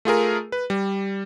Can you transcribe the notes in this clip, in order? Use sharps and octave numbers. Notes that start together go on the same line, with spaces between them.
A3 F4 G#4 A#4
B4
G3